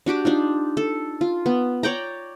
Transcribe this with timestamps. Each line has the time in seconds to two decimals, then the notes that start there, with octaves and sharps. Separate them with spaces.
0.06 D4 F#4 G4 D6
0.25 D4 D#4 F4
0.77 A4
1.21 F4
1.46 B3
1.83 C#5 D5 G5 A#5